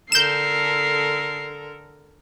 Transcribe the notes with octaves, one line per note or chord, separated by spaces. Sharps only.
D3 A4 A#4 G6 C7 E7